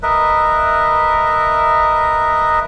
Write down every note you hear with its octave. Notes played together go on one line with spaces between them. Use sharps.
A#4 B4 D#5 E5